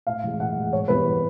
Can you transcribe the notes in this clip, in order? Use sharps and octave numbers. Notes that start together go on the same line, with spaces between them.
A2 F5
E3 G#3
A2 F#5
E3 G#3
G#2 C#5
E3 G3 B3 B4